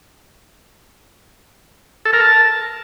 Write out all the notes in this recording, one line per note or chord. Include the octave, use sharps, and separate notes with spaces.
A4
A#4
A5